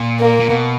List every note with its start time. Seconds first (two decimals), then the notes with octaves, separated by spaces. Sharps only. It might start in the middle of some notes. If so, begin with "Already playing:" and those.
Already playing: A#2
0.20 A#3
0.40 A#2
0.50 B2